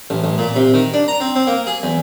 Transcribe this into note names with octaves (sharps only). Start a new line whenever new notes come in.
A1
A1
A#2
C3
D#3
D4
A#5
C4
C4
A#3
G#4
E2